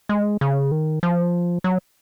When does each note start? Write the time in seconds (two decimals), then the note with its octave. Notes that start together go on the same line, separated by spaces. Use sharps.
0.09 G#3
0.41 C#3
0.71 D#3
1.03 F3
1.64 F#3